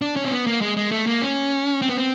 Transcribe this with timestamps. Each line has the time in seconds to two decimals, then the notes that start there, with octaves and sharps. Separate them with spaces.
0.02 D4
0.16 C#4
0.25 C4
0.31 B3
0.47 A#3
0.61 G#3
0.77 G#3
0.92 A3
1.07 A#3
1.22 C#4
1.82 C4
1.89 B3
1.97 C4